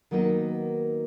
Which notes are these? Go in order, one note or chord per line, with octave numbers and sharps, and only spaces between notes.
D#3 F#3 A#3 B3 D#4